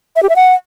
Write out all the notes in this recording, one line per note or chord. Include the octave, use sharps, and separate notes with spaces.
E5
G4
E5
F#5